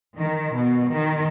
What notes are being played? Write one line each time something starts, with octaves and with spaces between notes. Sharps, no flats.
D#3
B2
D#3